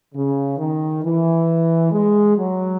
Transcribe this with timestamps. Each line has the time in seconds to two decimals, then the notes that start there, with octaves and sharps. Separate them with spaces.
0.14 C#3
0.58 D#3
1.03 E3
1.92 G#3
2.37 F#3